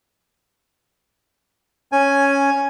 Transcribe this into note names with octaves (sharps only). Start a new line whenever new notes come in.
C#4 G#5